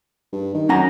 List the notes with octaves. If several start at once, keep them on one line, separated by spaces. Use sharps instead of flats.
G2
D#3
F#2 C#4 F#5 A#5